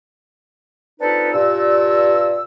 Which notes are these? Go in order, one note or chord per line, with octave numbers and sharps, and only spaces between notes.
C4 D4 D#4 F4 A4 B4
G2 A#2 E6